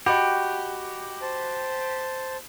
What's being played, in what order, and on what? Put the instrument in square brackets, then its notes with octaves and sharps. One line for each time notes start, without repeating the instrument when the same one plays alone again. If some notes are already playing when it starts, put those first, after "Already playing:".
[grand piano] F#4 [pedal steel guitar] G4 [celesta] D#5 G5 B5
[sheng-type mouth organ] C5 A5